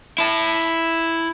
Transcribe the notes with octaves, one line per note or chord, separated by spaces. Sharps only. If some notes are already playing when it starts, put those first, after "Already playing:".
E4 A5